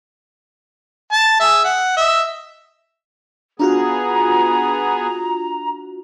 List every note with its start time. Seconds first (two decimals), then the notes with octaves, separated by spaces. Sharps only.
1.12 A5
1.40 G#4 E5
1.64 F#5
1.97 D#5 E5
3.59 B3 D4 F4 F#4 G#4 A#5